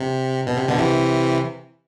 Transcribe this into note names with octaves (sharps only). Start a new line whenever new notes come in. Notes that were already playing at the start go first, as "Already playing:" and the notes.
Already playing: C3
B2
C3
B2 D3
C3 E3